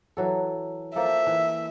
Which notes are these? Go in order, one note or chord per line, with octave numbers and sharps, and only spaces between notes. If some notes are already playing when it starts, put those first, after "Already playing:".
E3 F#3 A4
F3 A#3 A4 E5
E3